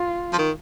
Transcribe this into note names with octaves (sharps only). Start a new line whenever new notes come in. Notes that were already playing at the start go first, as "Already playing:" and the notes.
Already playing: F4
F3
D#3